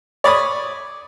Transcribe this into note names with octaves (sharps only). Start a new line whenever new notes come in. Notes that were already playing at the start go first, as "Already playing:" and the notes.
C#5 D5 B5 D#6